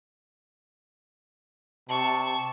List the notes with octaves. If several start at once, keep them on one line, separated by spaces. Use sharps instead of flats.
C3 A5 C#6